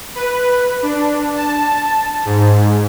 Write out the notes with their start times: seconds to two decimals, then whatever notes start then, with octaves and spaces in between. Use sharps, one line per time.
0.15 B4
0.83 D4
1.35 A5
2.25 G#2